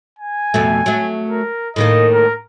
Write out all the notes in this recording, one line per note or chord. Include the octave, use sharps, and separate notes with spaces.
G#5
F2 B2 A3
F#3 A3
A#4
A2 D#3 A#3 D#5
A#4